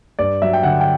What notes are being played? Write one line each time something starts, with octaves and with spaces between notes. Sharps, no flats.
G2 D5
F#3 E5
G5
D3 F#5
G5